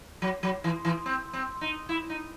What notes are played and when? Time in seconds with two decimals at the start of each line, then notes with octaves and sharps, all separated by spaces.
0.22 F#3
0.43 F#3
0.64 E3
0.85 E3
1.06 C4
1.33 C4
1.61 D#4
1.89 E4
2.10 D#4